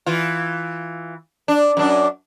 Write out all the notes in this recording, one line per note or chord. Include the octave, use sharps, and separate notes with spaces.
E3 F4
D4
F#2 D4